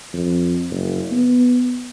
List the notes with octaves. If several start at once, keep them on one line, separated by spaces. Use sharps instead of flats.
F2
F#1
B3